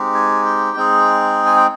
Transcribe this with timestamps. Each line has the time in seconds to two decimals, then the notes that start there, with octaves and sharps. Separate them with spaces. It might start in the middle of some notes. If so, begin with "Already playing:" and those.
Already playing: G#3 C4 D#4 G4
0.15 G#5
0.46 G5
0.76 G#3 C4 D#4 G#4
1.46 G#5
1.56 G5